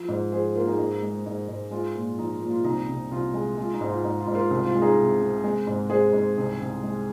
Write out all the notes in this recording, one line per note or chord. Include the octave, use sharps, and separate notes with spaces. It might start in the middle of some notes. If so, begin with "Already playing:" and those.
Already playing: F3
G#2
F3 G#4 C5
A#3 F4 A#4
D#4 G#4
G#2
G#3
G#2
G#2
G#3 F4
A#2
F3 D#4
A#2
F4
C2 D#4
C2
C2 F4
G#3
G#3 F4
D#4
G#2
F4
G#2 D#4
F4
G#2
F4 A#4
C2 F4
F4
G#3
D#4 G#4
C3
C3
G#3
G#2
G#3 G#4 C5
G#2
C2
C2
G#3